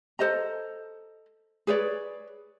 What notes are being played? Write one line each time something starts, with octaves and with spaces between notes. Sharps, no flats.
A4 C5 D#5 A#5
G#4 B4 C#5 D5